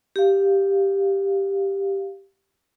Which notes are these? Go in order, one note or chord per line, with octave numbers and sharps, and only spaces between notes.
G4 F5